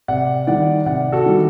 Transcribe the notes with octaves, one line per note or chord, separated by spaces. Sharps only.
C3 D5 F#5
D#3 G3 D5 F#5
C3 D5 F#5
F#4 A4
D#3 G3